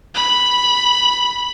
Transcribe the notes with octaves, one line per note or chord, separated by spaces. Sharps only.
B5